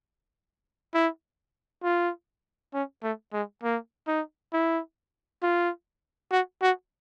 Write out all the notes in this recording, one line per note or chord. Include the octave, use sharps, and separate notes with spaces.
E4
F4
C#4
A3
G#3
A#3
D#4
E4
F4
F#4
F#4